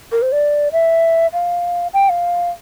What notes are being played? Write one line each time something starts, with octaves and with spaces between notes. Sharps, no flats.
A#4
C5
D5
E5
F5
G5
F5